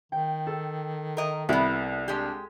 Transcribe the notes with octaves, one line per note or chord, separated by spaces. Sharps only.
D#3 G5
A4
A#4 D#5
C2 B3 E4
G#3 D4 G4